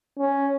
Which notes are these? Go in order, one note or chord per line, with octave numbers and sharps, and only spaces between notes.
C#4